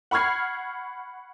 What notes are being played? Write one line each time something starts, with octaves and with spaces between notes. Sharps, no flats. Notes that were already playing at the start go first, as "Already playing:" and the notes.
F#5 B5 C#6 F6 G#6 C7